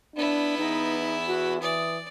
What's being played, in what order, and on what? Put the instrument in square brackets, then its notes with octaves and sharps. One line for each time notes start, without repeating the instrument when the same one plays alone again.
[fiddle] B3 E4 [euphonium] D4
[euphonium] E2 [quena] D#4
[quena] F#4
[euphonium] E3 [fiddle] D5 [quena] D#6